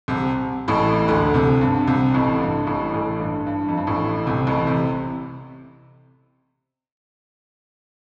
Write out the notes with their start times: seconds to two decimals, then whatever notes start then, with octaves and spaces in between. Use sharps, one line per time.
0.08 C2 C3
0.68 A1 A2
1.08 D2 D3
1.34 C2 C3
1.61 G2
1.87 C2 C3
2.14 A1 A2
2.41 G2
2.67 A1 A2
2.94 A1 A2
3.20 G2
3.46 G2
3.68 F2
3.77 G2
3.87 A1 A2
4.26 C2 C3
4.47 A1 A2
4.67 C3